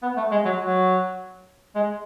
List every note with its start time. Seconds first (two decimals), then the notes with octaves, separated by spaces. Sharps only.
0.03 B3
0.17 A3
0.31 G#3
0.45 F#3
0.60 F#3
1.75 G#3